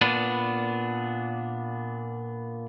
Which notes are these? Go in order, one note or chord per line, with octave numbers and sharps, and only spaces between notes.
A#2 B3 D4